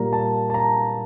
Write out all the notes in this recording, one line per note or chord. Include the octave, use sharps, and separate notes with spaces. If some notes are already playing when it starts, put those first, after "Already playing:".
Already playing: A#2 G3 A#3 A#5
A5
A5
A#5